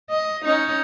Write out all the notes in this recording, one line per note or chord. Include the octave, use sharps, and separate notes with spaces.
D#5
C#4 D#4